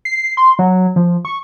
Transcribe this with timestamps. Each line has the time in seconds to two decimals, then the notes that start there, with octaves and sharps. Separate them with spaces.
0.05 C7
0.37 C6
0.59 F#3
0.96 F3
1.25 C#6